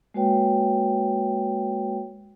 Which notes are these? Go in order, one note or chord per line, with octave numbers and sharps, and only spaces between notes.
G#3 A#3 F#4 B4 C#5 G5